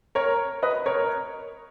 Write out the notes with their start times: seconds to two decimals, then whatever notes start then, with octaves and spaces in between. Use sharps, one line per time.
0.15 A#4 C#5
0.63 B4 D#5
0.86 A#4 C#5